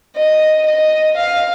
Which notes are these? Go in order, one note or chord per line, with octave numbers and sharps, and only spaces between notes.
D#5
D#5
F5